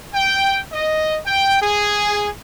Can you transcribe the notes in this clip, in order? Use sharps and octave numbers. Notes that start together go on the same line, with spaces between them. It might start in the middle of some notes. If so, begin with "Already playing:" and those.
G5
D#5
G5
G#4